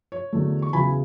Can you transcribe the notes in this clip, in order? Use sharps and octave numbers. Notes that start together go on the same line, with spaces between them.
C#5
E2 D3 F#3 A3
C#6
E2 C#3 F#3 G#5 B5